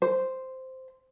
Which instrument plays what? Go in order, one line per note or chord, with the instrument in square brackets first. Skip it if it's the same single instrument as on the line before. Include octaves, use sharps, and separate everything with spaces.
[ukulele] C5